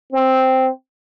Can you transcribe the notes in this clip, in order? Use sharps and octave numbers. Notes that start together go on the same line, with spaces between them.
C4